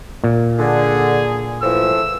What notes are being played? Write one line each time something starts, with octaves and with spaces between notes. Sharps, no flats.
A#2
D3 G#4
A2 E3 F3 E6